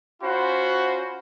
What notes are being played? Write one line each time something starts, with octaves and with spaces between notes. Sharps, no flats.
C#4 F4 F#4 C5 B5